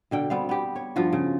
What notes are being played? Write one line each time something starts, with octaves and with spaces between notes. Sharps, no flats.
B2 D3 G5
G3 B3 C4 F5
B3 G4
C#5
G2 F3 F4 F#4
C#3